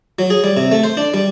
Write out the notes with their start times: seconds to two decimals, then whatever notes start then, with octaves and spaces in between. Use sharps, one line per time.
0.19 F#3
0.30 G#4
0.44 G3
0.57 C3
0.72 A3
0.84 C5
0.97 D4
1.14 G3